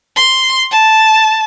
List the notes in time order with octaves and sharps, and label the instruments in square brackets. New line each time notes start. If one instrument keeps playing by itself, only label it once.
[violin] C6
A5